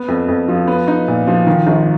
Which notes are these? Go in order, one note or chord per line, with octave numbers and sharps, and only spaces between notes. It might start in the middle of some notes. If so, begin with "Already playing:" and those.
Already playing: B3
F2
F2
F3
B3
D#4
A#2
F3
D#3
G#1